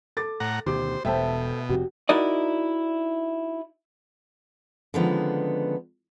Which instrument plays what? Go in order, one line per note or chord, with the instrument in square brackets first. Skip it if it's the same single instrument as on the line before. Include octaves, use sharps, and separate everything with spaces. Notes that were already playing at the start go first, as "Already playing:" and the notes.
[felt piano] A4 D6 A6
[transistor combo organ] A2 F#5 A#5
[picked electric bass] D2 B2 D#3 [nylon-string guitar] G4 [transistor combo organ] C5 [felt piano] D6
[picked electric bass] E1 [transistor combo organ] B2 [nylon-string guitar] A3 C5 [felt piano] E5 G5 A5
[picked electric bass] F1 F2 C3 [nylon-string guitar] F#4 G4
[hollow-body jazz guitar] D#4 E4 F#4 A#4 D5 D#5
[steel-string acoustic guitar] D3 D#3 F3 G#3 B3 C#4